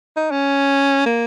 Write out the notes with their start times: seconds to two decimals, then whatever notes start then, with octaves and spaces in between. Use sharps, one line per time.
0.17 D#4
0.31 C#4
1.06 A#3